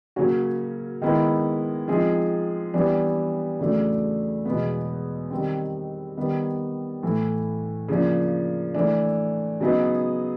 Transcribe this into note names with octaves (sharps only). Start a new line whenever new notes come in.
C#3 F#3 A#3 C#4 F#4
D#3 G#3 B3 E4
F3 G#3 C4 D#4 G#4
E3 G3 B3 D4
E2 C#3 F#3 A3 D4
E2 B2 G#3 B3
D#3 G3 C4
D#3 G3 B3
A2 E3 A3
C#3 F3 A#3 D4
E3 A3 D4
C#3 F#3 B3 D#4 G#4